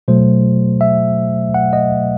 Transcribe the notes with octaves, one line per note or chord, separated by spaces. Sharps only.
B2 F#3 A3 C5
E5
F#5
D#5